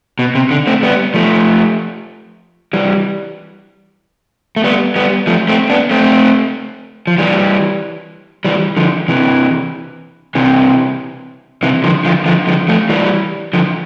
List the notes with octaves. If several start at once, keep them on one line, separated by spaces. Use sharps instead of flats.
B2
C3
D3
A3 C4
G3 B3
F3 A3
E3 G3
A3
G3 B3
G3 B3
F3 A3
A3 C4
B3 D4
A3 C4
F3
E3 G3
E3 G3
D3 F3
C3 E3
C3 E3
C3 E3
D3 F3
D3 F3
D3 F3
D3 F3
F3 A3
E3 G3
D3 F3